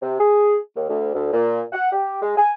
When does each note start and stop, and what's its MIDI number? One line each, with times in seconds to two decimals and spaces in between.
0.02 0.19 48
0.20 0.56 68
0.76 0.89 39
0.90 1.14 38
1.14 1.32 38
1.33 1.61 46
1.73 1.92 78
1.92 2.19 67
2.22 2.37 56
2.38 2.53 80